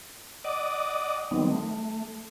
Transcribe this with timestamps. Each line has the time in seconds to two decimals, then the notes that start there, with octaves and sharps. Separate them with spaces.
0.44 D5 D#5 F#5 D6 D#6
1.31 D#3 F#3 G3 B3 C4 D#4
1.49 A3